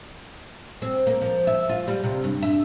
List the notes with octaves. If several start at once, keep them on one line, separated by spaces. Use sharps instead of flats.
C4
A#3
F3
E5
F4
G3
C3
G2
E5